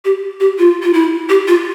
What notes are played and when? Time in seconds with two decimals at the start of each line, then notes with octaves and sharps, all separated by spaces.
0.05 G4
0.40 G4
0.59 F4
0.83 F4
0.93 E4
1.29 G4
1.48 F4